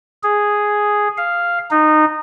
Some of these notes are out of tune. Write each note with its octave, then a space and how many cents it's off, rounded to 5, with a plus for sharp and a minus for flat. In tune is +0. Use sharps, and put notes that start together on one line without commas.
G#4 +0
F5 -5
D#4 -20